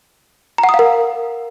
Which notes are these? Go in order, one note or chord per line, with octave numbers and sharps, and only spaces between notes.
A#5
F#5
D#6
F5
A#4